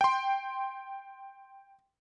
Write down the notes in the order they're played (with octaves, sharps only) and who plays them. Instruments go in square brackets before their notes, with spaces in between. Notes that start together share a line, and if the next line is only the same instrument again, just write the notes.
[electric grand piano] G5 C6